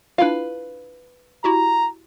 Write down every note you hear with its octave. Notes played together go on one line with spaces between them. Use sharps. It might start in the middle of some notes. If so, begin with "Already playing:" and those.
D4 E4 F4 B4 F5
E4 F#4 G4 A#5